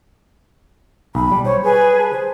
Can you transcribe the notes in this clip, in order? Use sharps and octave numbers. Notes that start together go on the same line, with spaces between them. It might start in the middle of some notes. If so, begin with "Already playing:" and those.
B1 B5
G3
C5 C#5
G#4 B4 G#5
A5
C5